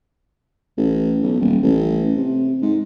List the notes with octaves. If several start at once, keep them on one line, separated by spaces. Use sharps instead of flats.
A1
B1
D#1
A1
C3
G#2